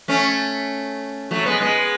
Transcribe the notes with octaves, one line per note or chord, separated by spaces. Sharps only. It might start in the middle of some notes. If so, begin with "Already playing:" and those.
A3 C#4
F#3 A3
G#3 B3
G#3 B3